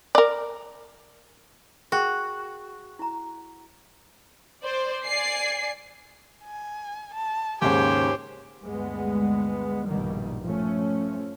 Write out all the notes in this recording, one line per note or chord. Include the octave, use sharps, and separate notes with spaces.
A#4 D5
F#4 G#4 A#4 G5
E4 A#5
C5 D5
D5 G#5 C7
G#5
A5
D#2 G#2 C#3 G4 C5 C#5 G#5
D2 G2 G#3 B3
A#1 G2 B2 D#3 G3
F3 A3 C#4